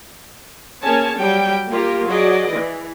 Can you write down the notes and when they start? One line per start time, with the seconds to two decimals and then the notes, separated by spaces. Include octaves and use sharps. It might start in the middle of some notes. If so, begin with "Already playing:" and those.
0.82 A#3 C#4 G#4 C#5 G#5 A5
1.17 F#3 G3 G5
1.70 A#3 F4 G4 A#4
2.07 F#3 G#4 D5 D#5
2.51 E3